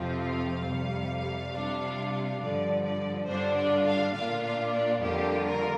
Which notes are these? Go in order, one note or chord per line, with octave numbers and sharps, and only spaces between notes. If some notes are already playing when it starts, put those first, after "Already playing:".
Already playing: F2 C3 F3 C4 F4
F5
F2 C3 G3
C3 G3 D4 F4
G2 D3 F3 D5
D5
G2 D3 G3 D4 F4 C5
D5
F5
A#2 A#3 D4 F4 F5
F5
D5
F2 D3 G3 A#3 F4 G4
A#4